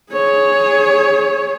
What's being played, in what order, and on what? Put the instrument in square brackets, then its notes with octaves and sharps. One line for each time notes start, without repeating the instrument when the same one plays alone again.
[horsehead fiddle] G#4 C#5